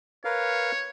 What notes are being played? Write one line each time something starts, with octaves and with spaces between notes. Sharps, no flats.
A#4 B4 C#5 F5